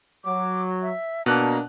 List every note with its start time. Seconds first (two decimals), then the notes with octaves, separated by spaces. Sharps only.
0.25 F#3 D6
0.82 E5
1.26 B2 A#3 D4 A#5 F#6